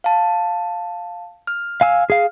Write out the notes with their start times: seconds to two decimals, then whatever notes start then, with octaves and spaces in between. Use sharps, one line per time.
0.04 F5 A5
1.47 F6
1.81 F5 G#5 E6
2.10 G#4 F5